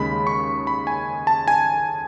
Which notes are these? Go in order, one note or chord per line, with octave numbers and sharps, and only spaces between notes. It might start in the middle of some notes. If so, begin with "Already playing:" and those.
Already playing: D#2 C#3 G#3 B5
C#6
B5
G#5
A5
G#5